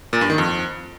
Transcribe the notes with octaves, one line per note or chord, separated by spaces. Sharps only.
A#2
G2
D#3
F2